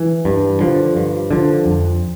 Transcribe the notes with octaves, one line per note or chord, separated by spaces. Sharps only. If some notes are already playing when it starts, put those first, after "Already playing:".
Already playing: E3
G2
D3 F3
G2
D3 F3
F2